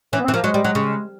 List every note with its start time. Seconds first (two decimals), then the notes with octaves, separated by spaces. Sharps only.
0.13 E3 C#4
0.19 B3
0.24 E3 C4
0.33 F3 A#3
0.43 F#3 G#3
0.54 G3
0.65 F#3
0.75 C#3